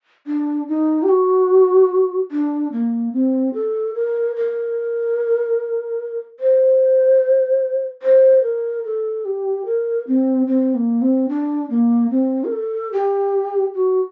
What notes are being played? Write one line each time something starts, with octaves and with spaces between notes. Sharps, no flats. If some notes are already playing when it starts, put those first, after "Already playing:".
D4
D#4
G4
F#4
D4
A#3
C4
A4
A#4
A#4
C5
C5
A#4
A4
G4
A#4
C4
C4
A#3
C4
D4
A#3
C4
A#4
A4
G4
F#4